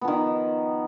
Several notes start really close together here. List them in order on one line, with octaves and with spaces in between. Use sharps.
B3 F3 D#3